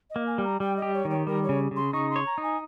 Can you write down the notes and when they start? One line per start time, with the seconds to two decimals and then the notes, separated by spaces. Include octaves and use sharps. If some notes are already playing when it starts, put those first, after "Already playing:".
0.10 D#5
0.16 A#3
0.27 G#5
0.38 G3
0.44 A#5
0.60 G3 G5
0.77 D#5
0.82 G4
0.94 C#5
1.05 D#3
1.10 C#5
1.27 G3 A#4
1.44 C#5
1.49 C#3
1.71 C#3
1.76 C6
1.93 D#4 C#6
2.10 C6
2.16 C#5
2.26 A#5
2.38 D#4
2.43 G#5